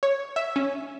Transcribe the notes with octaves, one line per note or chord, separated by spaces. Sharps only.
C#5
E5
C#4